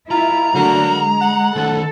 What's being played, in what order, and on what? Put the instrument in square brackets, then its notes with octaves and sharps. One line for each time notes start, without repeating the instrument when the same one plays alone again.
[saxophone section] D#2 F4 [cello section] E4 [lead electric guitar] A#5
[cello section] D3 F#3 A3 [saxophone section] A#3 F#4
[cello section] G#3
[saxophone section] F#5
[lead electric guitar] D#3 A3 [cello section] A4